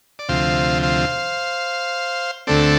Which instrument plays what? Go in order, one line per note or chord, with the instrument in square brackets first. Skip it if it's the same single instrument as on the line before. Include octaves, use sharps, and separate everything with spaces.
[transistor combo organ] D5
D2 C3 F3 C5 F5
C5 F5
D2 D3 A3 C4 A4 D5